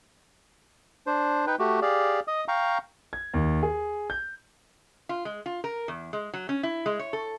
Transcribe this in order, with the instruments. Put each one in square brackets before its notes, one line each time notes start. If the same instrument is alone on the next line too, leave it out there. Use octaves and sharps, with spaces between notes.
[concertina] D4 C5
D#4 B4 G5
A3 F#4 G4
G4 G#4 D5 F5
D#5 D#6
F5 G5 A#5 C#6
[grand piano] G#6
D#2
G#4
G6
[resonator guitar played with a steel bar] F4
G#3
F4
A#4
E2
G#3
F#3
C#4
E4
G#3
C#5
A4